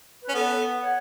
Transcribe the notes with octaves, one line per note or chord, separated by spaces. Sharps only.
B4
C#4
B3 A4
C#5 F#5